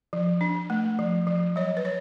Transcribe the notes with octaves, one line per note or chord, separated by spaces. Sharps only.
F3
D4
A3
F3
F3
F#3 C#5
B4
C#5